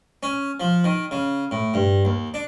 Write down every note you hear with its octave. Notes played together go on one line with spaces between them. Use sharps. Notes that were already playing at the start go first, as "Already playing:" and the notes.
C#4
F3
D#3
C#3
A2
G2
D#2
D4